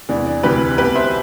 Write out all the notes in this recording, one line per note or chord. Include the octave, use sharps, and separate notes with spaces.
E2 C3 E3 D4
D4
D2 C3 E3 G4 B4
C2 B2 G4 B4
C5 E5